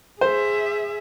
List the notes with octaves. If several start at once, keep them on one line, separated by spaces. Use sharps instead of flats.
G#4 C5 E5